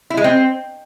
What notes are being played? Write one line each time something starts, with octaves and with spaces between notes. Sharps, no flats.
E4
G#3
C4